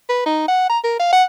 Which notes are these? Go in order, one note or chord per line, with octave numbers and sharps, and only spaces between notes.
B4
D#4
F#5
A#5
A#4
F5
F#5